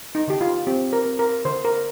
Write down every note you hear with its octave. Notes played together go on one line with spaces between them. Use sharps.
D#4
D3 G4
F4
C4 G4
A#4
C4
A#4
D3 C5
A#4